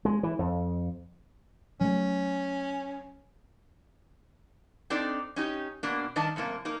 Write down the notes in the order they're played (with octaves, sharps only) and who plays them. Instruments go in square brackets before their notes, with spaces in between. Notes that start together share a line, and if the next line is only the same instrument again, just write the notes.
[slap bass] G#3
E3
F2
[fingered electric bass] F#3 A3 [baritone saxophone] C#4
[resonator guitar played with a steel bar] C4 D4 D#4 A4 D5
C#4 D#4 G4
B2 A#3 D4
G2 D#3 D4 D#5 A5
F#2 A2 C3 A#3
A#3 D#4 A#4